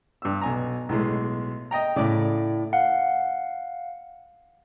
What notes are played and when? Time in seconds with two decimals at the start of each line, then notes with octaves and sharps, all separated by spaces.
0.22 G2 E6
0.41 B1 G#5 A#5
0.89 B1 A2 G#3
1.71 D#5 G5 A#5
1.96 A2 C#3 D5
2.73 F5 F#5